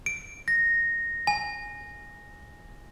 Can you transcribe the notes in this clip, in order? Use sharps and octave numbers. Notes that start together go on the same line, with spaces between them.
D7
A#6
G#5